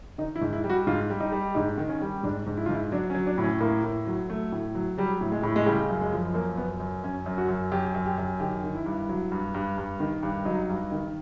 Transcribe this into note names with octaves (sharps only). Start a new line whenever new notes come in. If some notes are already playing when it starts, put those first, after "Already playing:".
D#3 D#4
E4
G#2
E4
G3
F#4
G#2 F4
G3
D#4
G3
G#2 D#4
D#3
C#4
G3
G#2 D4
G#2
E4
F4
G#2 E4
F#3 D4
C#4
F#3
D4
A2
C#4
A2 A#3
A2
F#3
F#3 A3
A2
F#3
F#3 G3
A2
G#3
A2
G#3
C#3 G3
F#2
G#3
F3
F#2 A#3
F#2 B3
F#2
F#2 C#4
F#2
F#4
F#2
F#2 G4
F#2
G4
F#2
D#3 G4
D#3
E4
G2
F#3
G2
G2
G2
D#3
G2
F#3 D#4
G2
D#3